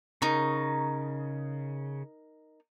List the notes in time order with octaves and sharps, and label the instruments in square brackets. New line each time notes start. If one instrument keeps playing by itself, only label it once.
[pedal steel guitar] C#3 [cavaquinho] D#4 A#4 C#6